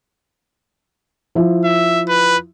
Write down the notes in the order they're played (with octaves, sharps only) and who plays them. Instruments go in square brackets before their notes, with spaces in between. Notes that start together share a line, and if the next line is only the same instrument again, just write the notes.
[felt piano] F3 E4
[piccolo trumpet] E5
B4